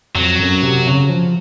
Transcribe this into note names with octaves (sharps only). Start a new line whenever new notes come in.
F2 F#3
F#2
C3
C#3
F3